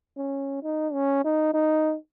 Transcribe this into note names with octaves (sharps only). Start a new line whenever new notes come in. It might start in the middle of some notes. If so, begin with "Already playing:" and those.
C#4
D#4
C#4
D#4
D#4